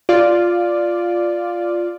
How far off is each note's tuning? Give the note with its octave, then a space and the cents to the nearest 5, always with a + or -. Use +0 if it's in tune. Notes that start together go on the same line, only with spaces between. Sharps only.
F4 +0 D5 +0